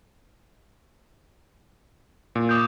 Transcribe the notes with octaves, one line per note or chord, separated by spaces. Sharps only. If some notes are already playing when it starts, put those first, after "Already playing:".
A#2
D6 D#6 G6